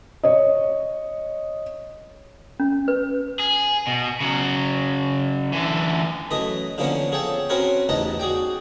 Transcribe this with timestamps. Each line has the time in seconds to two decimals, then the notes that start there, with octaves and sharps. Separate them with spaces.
0.23 C#5 D#5
2.60 C#4
2.88 B4
3.39 G#4
3.87 B2
4.20 C#3 F#3
5.53 D3 E3
6.31 F#2 E3 A3 D#5
6.78 D3 E3 F3 A#3 B3 C#4
7.12 G#4 A4 C#5 G5 A5
7.49 C4 C#4 F#4 A#4 B4 C#5
7.89 A1 E2 E3 D#4 D#5 A5
8.19 F#4 G#4 D5 G5